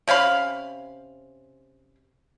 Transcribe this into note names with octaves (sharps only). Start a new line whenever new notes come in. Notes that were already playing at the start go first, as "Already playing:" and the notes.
C3 C#4 F5 B5